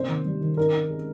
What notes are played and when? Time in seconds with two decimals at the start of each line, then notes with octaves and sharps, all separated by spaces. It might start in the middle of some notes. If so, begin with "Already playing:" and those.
Already playing: C3 A#3 C5
0.08 D#3
0.25 G3
0.41 D#3
0.57 D#4 A#4
0.74 D#4
0.90 G#3